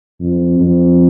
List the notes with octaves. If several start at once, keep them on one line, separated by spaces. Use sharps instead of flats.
F2
F2